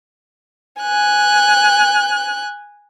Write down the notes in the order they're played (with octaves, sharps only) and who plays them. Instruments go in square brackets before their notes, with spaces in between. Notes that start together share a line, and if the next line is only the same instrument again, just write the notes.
[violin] G#5 F#6